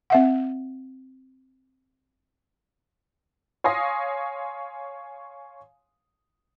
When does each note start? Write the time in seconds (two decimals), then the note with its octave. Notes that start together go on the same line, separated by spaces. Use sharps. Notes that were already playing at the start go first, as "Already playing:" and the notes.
0.10 C4 E5 F#5
3.64 C#5 F5 G#5 C6 D#6 A#6